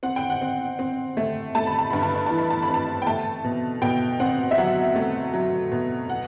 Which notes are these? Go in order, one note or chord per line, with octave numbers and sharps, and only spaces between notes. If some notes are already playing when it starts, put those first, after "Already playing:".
C4 F#5
G5
F#5
C4
C4
A3
A3 A5
B5
A5
G2 B5
A5
B5
E3 A5
B5
A5
B5
C4
A5
G5
A3 A5
B2
B2 G5
C4 F#5
E5
F#3 F#5
A3
F#3
B2
F#5